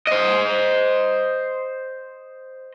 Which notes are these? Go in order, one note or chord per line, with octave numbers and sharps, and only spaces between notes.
C5 D#5